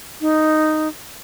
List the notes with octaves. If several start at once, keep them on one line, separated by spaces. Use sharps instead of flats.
D#4